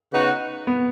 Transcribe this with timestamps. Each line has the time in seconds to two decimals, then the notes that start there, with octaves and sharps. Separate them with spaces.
0.12 C#3 B3 D#4 F#4
0.67 B3